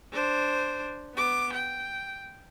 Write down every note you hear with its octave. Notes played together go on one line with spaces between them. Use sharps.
D4 C5
B3 D6
G5